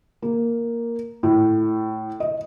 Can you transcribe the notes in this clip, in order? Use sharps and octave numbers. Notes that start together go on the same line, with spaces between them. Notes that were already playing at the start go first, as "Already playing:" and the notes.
A#3
A2
D#5